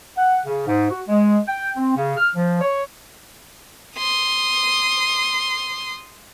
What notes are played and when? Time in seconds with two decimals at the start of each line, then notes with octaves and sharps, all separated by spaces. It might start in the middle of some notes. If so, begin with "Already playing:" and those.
0.17 F#5
0.45 C#3
0.67 G#2
0.91 F#4
1.08 G#3
1.46 G5
1.76 C4
1.97 C#3
2.17 F6
2.35 F3
2.61 C#5
3.96 C6 D#6